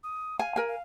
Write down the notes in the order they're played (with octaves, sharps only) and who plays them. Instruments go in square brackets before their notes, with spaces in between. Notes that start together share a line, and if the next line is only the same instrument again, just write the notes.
[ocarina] D#6
[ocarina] F5 [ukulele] G#5
[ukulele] A#4 G#5
[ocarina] F5